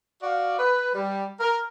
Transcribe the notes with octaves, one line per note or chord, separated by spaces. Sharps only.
F#4 D5 F5
B4
G3
A#4